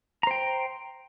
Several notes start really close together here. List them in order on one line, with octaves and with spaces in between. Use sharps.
A#5 C5 G5